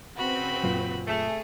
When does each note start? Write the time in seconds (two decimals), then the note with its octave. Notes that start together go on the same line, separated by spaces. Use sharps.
0.16 C#3 C4 F#4 B4 B5
0.64 F#2 A#2 F4
1.07 A3 G#4